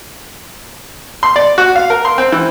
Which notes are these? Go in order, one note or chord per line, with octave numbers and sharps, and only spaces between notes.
C6
D5
F#4
F5
A#4
C6
C4
E3